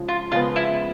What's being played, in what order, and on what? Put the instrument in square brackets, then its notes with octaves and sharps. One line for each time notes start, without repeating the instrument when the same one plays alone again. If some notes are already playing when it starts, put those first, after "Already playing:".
Already playing: [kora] C#3 F3 G#3
[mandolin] F4
[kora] C#3 F3 G#3 B3 [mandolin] F4
[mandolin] E4